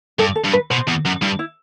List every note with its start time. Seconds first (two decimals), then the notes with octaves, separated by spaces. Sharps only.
0.19 G2 A4
0.35 A4
0.44 G2
0.53 B4
0.70 B2 C5
0.87 E2
1.05 F#2
1.22 G2 E4
1.39 E4